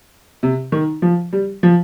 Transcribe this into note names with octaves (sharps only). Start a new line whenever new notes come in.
C3
D#3
F3
G3
F3